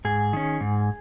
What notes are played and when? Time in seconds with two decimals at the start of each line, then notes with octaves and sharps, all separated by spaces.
0.05 G#2 G#4
0.33 D#3 C#4
0.61 G#2